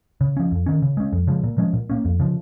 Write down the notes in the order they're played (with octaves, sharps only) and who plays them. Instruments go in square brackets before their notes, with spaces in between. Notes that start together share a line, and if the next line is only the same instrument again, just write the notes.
[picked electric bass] C#3
F3 C#4
F2
D#3 C#4
C#3
G#3 C#4
F2
C#3 F3 G#3
A#2
F3 G#3 C#4
A#2
A#3 C#4
F2
C#3 F3